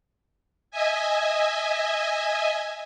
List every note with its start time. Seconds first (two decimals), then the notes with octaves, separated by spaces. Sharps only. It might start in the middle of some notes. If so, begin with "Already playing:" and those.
0.71 D#5 E5 G#5